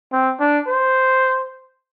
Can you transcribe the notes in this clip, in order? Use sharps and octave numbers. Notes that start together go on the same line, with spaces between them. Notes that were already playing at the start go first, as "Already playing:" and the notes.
C4
D4
C5